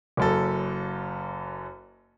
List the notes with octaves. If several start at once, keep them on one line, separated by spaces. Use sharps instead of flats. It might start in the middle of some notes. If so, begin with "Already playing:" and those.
F#1 F#2 A4